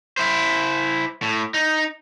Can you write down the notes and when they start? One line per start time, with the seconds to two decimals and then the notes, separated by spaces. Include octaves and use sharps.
0.17 E4 C5
1.22 A2
1.54 D#4